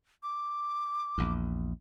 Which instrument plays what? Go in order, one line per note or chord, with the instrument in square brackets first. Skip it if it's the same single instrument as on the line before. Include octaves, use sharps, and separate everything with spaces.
[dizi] D6
[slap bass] A#1 E2